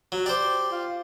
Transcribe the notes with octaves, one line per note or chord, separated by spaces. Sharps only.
F#3
G4 C5 D5
F4